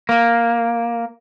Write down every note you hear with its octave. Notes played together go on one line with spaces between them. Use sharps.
A#3